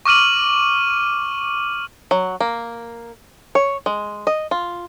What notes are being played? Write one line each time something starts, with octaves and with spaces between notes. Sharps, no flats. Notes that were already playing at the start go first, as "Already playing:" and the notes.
C#6 D6 F6 D#7 F#7
F#3
A#3
C#5
G#3
D#5
F4